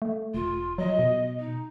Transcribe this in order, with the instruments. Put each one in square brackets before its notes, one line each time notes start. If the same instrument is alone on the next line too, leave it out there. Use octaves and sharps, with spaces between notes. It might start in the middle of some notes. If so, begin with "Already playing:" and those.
[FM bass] A3
[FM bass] E1 [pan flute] F4
[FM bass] F#3 [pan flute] D#5
[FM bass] B2
[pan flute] D#4